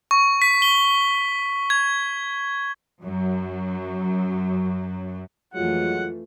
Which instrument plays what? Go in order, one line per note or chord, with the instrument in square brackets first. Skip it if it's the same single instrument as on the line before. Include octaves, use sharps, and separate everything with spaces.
[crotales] C#6
B6
G7
G#6
[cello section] F#2 F#3
[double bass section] F2 E3 A3 [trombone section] F#3 G#3 [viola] F4 [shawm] F#5